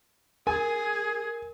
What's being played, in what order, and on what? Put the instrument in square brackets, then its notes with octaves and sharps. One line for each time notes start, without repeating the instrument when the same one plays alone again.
[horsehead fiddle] G#4 [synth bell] A#4 [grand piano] G#5